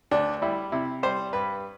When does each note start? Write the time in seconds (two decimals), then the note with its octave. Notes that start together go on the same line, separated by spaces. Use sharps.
0.11 D2 D4
0.42 G3 E4
0.72 C3 E4
1.03 G3 C5
1.33 G2 B4